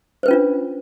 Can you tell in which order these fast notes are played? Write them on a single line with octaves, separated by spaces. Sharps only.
C5 B4 C#4 F4 D4